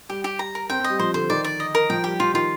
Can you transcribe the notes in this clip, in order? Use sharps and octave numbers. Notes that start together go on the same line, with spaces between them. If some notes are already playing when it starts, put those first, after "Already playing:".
G3 G4
G4
A#5
A#4
C4 G5
C4 D#5
G3
F3 C5
D3 C5
D#3 D5
D5
D#5
A#4
F3 G5
G3 G4
F3 F4
D#3 F4